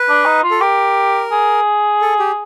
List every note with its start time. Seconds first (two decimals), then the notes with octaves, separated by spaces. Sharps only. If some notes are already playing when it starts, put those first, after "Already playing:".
Already playing: B4
0.09 D4
0.26 D#4
0.44 F4
0.51 A4
0.61 G4 A#4
1.32 G#4
2.01 A4
2.19 G4